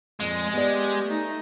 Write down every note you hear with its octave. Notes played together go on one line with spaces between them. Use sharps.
F2 A#2 G#3
B3 G4 D5
A3 D#4